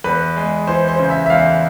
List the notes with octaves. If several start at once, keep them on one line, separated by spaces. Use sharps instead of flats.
E2 B4
G#3
E3 C5
C5
C#3
E5
E5
E2 F5